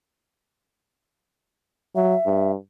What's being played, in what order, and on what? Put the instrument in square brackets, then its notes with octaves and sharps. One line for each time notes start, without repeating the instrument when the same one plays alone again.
[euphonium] F#3 [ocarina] E5
[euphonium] G2